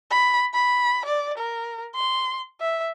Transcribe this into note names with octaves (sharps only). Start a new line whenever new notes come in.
B5
B5
D5
A#4
C6
E5